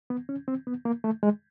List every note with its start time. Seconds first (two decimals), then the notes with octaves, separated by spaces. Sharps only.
0.10 B3
0.29 C#4
0.48 C4
0.67 B3
0.85 A#3
1.04 A3
1.23 G#3